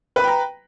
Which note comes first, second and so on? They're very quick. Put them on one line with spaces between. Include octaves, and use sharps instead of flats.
B4 B5 G5 A#5